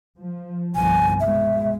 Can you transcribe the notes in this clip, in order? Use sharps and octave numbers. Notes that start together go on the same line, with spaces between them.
F3
G1 C2 F3 G#5
B2 G#3 E5